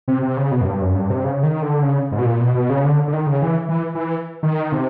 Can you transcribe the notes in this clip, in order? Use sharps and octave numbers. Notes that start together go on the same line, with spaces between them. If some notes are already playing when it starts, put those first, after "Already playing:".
C3
C3
C#3
B2
F#2
G2
F#2
G2
C3
C#3
D#3
D3
C#3
G#2
B2
A#2
B2
B2
C#3
D3
D3
D#3
C#3
E3
E3
E3
D#3
C3